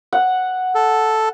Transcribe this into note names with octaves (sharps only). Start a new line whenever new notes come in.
F#5
A4